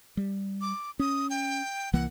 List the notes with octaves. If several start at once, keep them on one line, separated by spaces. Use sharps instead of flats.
G3
D6
C#4 D#6
G5
C2 E3 A#3 F#5